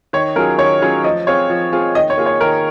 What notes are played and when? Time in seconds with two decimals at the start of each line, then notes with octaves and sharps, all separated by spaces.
0.13 D#3 C#5
0.36 F#3 C#4 F4 G#4 A#4
0.58 D#3 C#5
0.82 F#3 C#4 F4 G#4
1.04 F3 D#5
1.27 C4 F4 G#4 C#5
1.50 F3
1.72 C4 F4 G#4
1.95 D#3 D#5
2.10 C#5
2.17 A#3 F4 G#4
2.26 C#5
2.41 D#3 A#4